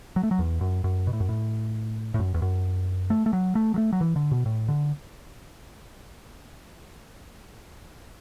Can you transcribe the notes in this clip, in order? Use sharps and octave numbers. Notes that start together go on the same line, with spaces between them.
F#3
A3
F#3
E2
F#2
F#2
B2
A2
F#2
A2
A2
F#2
E2
F#2
A3
A3
F#3
A3
F#3
A3
F#3
E3
D3
B2
A2
D3